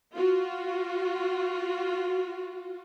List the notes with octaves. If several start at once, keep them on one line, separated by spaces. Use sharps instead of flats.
F4 F#4